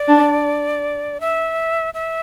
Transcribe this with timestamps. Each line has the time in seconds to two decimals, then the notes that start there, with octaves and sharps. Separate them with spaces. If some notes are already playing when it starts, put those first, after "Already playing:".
Already playing: D5
0.08 D4
1.21 E5
1.94 E5